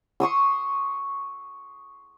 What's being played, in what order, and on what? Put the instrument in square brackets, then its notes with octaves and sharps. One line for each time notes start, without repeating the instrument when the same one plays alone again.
[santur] C6 C#6 D#6 E6